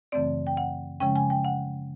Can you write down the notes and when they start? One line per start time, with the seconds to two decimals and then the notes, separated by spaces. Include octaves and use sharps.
0.12 F#2 C#3 E3 A3 C4 D5
0.47 G5
0.57 F#5
1.00 C#3 F3 G#3 C#4 G5
1.16 G#5
1.30 G5
1.44 F#5